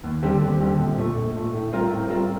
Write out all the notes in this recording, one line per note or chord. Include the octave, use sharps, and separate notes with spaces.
D#2
D3 G3 C4 G4
D#2
D3 G3 C4 G4
A#1
A#2 A3
A#1
A#2 A3
A2
G3 C4 F4 A#4
A2
G3 C4 F4 A#4